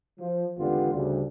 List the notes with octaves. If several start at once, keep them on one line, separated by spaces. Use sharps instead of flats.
F3
G#1 E2 D3 B3 F4 G4
D2 C#3 G3